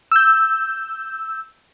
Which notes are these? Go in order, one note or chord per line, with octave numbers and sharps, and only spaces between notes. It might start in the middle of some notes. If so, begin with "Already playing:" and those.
E6 G6